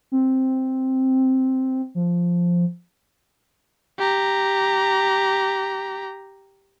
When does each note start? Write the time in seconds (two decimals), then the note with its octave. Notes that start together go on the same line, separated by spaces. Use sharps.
0.12 C4
1.95 F3
3.99 G4 A#5